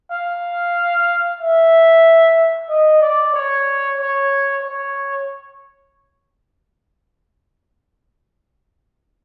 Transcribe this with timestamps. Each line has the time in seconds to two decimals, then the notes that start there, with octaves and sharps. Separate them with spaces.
0.11 F5
1.41 E5
2.69 D#5
3.01 D5
3.34 C#5
3.98 C#5
4.62 C#5